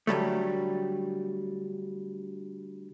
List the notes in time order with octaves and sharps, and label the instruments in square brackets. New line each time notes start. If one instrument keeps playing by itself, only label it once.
[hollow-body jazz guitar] D3 F#3 G3 A3